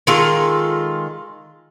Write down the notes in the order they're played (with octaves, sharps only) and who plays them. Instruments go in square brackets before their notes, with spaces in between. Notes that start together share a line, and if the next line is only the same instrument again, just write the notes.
[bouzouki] D#3 G#3 F4 A4